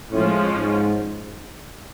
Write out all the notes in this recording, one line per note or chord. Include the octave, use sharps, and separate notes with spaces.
A2 F3 G#3 C#4
G#2